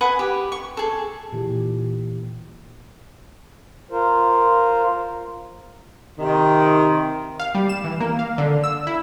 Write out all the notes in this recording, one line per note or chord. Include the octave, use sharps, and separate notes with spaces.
B4 F#5 G#5 D#6
G4
C#6
G#4 A4
A#2 E3 G4
F4 A#4 C5
C3 D#3
F5
G3
E7
E3
A#3
F5
D3
E6
E4